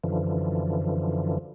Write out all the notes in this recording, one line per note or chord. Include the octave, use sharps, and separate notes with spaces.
F#2 D3 E3 F3